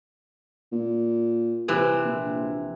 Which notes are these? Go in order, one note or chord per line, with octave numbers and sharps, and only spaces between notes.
A#2
C3 E3 C4
A#1